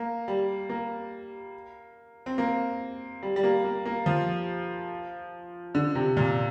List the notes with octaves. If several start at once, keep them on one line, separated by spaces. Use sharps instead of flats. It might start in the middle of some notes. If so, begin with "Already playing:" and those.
Already playing: A#3
G3
A#3
C4
A#3
G3
G3
A#3
A#3
A#3
F3
D3
C3
A#2